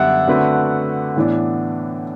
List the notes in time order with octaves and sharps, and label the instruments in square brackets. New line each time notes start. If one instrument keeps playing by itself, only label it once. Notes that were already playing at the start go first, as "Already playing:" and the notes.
Already playing: [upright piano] F#2 D3 G3 B3 [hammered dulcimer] D5 E5 F#5
[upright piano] D3 A3 C4 F#4 B4
A2 E3 B3 D4